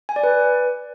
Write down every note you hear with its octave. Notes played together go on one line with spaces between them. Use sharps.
G#5
D5
B4